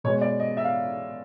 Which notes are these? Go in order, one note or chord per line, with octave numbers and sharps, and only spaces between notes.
B2 G#3 B3 C#5
D5
D#5
E5
F5